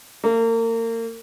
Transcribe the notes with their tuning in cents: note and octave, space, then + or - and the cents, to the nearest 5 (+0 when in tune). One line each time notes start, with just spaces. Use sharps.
A#3 -35